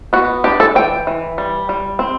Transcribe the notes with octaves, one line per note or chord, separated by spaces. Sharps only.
B3 F#4
D4 G4
A4
E3 G5
E3
G3
G3
C4